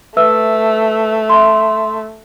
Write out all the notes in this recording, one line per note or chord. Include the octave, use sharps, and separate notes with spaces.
A3 B4 E5 E6
E5 C6